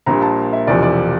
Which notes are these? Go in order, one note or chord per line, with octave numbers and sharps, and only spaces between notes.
A#1 A#2 G3 A#3 A#5
A5
E5
E1 E2 C3 F3 D5
D5